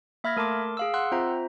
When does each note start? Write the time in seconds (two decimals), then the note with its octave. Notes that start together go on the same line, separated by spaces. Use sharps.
0.24 A#3 E5 B5 F6 G#6 A#6
0.36 A3 A#4 A5 C6 D6
0.77 G#4 F5 E6
0.94 F#5 C6 E6 F#6
1.11 C4 F4 C5 E5 A#5